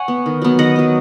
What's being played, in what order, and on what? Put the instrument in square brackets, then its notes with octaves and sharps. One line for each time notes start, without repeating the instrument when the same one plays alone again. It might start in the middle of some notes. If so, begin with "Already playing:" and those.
Already playing: [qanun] C#5 F#5 G#5
B3
D#3
F#3 B3
D#3 D#5 F#5
F#3 B3